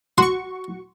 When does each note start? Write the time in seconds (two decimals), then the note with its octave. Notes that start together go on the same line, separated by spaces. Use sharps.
0.18 F#4 C6 C#6